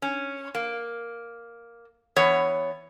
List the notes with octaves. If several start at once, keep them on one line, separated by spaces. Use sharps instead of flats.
C#4
A#3
E3 B3 C#5